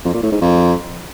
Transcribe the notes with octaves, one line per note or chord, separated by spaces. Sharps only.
F2
A#2
A2
G#2
F2